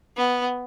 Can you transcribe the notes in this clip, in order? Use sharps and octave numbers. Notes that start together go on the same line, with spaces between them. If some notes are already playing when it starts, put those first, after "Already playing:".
B3